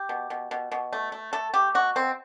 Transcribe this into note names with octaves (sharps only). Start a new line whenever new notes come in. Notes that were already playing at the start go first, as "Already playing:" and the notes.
Already playing: G4
B2
B2
B2
B2
A3
A3
A3 A4
A3 G4
B2 F#4
B2 C4